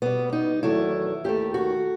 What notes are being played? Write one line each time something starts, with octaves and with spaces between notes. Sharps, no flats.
B2 G3 B3
D#4
E2 D#3 F#3 A3 E4
D#2 D#3 A3 G4
F#4